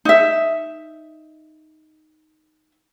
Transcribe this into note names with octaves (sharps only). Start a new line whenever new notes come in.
D#4 E5